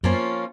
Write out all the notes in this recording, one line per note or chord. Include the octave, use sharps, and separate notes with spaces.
F#2 F3 A#3 C#4 F4